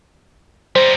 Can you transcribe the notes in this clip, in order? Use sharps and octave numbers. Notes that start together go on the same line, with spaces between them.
G3 D#4 C5